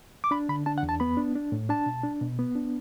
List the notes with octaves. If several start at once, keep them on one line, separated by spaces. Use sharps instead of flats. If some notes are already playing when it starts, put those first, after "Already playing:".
D6
D4 B5
D3 B5
D4 A5
F#5
E2
A5
B3 B5
D4
D4
A2
D4 A5
B2
D4
B2
B3
D4